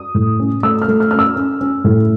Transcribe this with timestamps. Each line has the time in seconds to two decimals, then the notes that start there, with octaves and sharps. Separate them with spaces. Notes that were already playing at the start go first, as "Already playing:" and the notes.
Already playing: D#6
0.15 A2
0.40 C#4
0.63 A3 E6
0.82 F6
0.88 A3
1.00 F6
1.11 C#4 F6
1.19 E6
1.36 C#4
1.61 C#4
1.85 A2